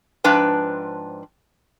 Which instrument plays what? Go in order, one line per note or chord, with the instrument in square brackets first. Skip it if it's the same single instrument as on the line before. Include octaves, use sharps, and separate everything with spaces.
[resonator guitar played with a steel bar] G#2 F3 D4 B4 G5